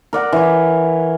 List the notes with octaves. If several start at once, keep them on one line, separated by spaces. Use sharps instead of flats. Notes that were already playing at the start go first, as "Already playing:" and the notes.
A#4 D5 F#5
E3 C#5